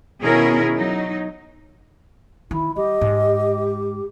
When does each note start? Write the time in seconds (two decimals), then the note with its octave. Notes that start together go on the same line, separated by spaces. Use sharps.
0.22 B2 D#3 C#4 E4 G#4 A#4
0.77 F#3 D#4
2.51 D#3 E4
2.76 G3 G4 D#5
3.01 G#2